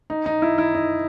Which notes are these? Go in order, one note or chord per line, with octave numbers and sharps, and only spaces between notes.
D#4
D#4
E4
E4
D#4